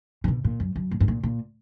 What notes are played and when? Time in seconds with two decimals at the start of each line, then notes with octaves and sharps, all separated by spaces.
0.24 D3
0.28 B2
0.44 A#2
0.60 F#2
0.76 F#2
0.91 A#2
1.00 G#2
1.08 A#2
1.23 A#2